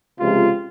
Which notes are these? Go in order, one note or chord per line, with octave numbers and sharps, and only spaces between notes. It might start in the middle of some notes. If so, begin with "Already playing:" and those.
C#2 C3 F3 G#3 F4